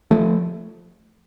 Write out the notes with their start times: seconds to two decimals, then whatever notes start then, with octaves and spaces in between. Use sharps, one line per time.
0.11 F3 A3